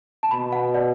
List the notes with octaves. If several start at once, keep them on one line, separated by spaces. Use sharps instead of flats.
A5
B2 B5
F#5
D5